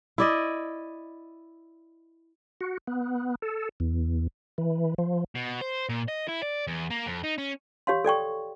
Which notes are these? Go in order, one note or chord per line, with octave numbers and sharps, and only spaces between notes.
E4 D5 D#5
F#4
B3
A4
E2
E3
F3
B2
C5
A#2
D#5
E4
D5
E2
A#3
F2
D#4
C#4
G4 C#5 F5 C6
A4 D5 G5 C#6